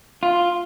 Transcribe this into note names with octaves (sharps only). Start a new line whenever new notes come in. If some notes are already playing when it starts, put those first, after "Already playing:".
F4